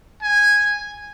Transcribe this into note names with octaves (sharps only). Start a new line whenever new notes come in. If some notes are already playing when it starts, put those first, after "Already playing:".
G#5